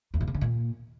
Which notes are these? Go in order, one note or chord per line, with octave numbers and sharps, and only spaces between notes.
E2
A2
B2
D3
A#2